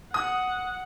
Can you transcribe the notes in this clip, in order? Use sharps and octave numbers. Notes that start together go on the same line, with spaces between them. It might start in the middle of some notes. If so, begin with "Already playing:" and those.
F#5 D#6